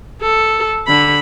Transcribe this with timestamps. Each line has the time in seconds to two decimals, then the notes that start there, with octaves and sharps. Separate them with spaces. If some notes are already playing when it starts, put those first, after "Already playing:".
0.22 A4
0.87 D3 B5